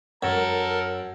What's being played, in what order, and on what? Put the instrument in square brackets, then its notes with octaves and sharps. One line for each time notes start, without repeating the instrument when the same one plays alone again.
[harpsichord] F#2 [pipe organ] A4 A#4 A5